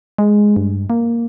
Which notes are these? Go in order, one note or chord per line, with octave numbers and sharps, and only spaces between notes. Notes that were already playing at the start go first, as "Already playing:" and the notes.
G#3
G2
A#3